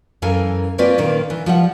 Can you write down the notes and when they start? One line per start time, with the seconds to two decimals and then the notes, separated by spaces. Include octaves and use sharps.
0.22 F#2 E3 A4 A#4 F5 G#5
0.78 A#3 C4 C#4 F4 B4 D5
0.98 A#2 D#3 A#3
1.30 E3
1.46 F3 G3 F#5